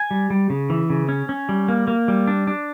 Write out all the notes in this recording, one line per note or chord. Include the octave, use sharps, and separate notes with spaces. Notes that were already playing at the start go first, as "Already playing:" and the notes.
Already playing: G#5
G3
G3
C#3
E3
C#3
C#4
C#4
G3
A#3
A#3
G3
D4
D4